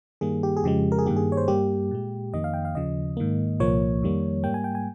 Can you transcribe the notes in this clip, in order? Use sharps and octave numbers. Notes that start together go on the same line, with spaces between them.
G2 D#3 G3 A#3 G#4
G4
G#4
F2 C#3 F3 G#3 G4
A#4
G#4
G2 D#3 A#3 G4
G#4
C#5
C5
G2 G3 A#3 G4
A#2 G#3
F2 D#3 A#3 D#5
F5
G5
F5
D#2 C#3 F3 D#5
G#2 D#3 A#3
C2 A#2 F3 A#3 C#5
F2 D#3 G3 A#3
G#2 G3 A#3 G5
G#5
G5
G#5